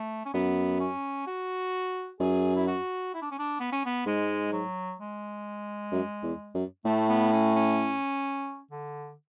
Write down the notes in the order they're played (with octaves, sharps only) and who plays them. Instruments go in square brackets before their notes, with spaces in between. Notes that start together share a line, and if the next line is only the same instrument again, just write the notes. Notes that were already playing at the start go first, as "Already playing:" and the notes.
Already playing: [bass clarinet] A3
C#4
[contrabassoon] F#2 [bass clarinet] B3
[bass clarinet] C#4
F#4
[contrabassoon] F#2 [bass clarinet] G#4
[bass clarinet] E4
F#4
E4
D4
C#4
D4
B3
C#4
B3
[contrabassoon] G#2 [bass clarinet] G#3
[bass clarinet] F#3
G#3
[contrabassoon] F#2
E2
F#2
[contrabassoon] A2 [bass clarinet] A3
[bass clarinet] B3
C#4
C#4
D3